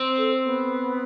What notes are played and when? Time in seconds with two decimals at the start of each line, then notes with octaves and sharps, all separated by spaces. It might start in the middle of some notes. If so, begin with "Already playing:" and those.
Already playing: C4
0.18 A4
0.44 B3